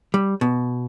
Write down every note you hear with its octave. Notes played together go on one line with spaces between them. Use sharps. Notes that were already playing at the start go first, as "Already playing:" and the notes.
G3
B2